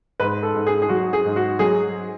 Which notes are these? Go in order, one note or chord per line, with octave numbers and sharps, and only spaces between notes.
G#2 B4
A4
G#2
G#4
G#4
F#3 F#4
G#4
G#2
F#4
F#3 G#4